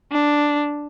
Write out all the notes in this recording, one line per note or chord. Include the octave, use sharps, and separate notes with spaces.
D4